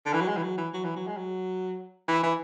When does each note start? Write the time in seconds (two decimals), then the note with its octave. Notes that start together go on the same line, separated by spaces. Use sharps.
0.06 D3
0.13 E3
0.21 F#3
0.28 G#3
0.37 E3
0.43 F#3
0.58 E3
0.73 F#3
0.84 E3
0.96 F#3
1.07 G#3
1.17 F#3
2.08 E3
2.23 E3